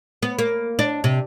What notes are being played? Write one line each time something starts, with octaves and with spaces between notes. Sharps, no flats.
B3
A#3
D4
C3